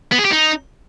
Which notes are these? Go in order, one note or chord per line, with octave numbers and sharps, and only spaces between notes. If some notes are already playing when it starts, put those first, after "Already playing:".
B3
G#4
G4
D#4